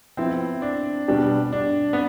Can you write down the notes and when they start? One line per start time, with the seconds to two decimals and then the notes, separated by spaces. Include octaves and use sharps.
0.17 F3 B3 C4 E4
0.62 D4
1.08 B2 G3 D4 G4
1.53 D4
1.93 B3